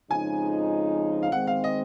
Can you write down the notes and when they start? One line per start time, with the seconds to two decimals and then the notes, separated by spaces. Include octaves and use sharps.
0.10 F2 C#3 F3 G#3 D#4 G#5
1.23 F5
1.32 D#3 G#3 C4 F#5
1.47 F5
1.64 D#5